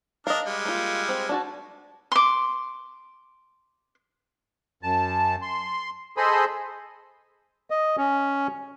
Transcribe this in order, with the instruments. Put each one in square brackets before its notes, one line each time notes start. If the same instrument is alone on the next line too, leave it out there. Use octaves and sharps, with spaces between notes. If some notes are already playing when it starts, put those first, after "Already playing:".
[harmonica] D4 A#4 F6 [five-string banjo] D#5 F5
[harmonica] G3 G#3
[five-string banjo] A#3 F4
C4
D4 F#4 A5
[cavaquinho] C6 D6
[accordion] F#2 A5
C6
G#4 A4 C5 D#5 B5 C6
[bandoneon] D#5
C#4